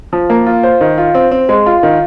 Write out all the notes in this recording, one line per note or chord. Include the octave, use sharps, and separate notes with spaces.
F3
A#3
F4
C5
D#3
F4
C4
C4
G#3
F4
D#3